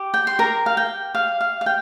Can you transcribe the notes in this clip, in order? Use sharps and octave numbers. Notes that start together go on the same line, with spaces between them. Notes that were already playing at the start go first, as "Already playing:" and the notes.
Already playing: G4
G5
C6
A#4 A#5
F5
G5
F5
F5
F5
G5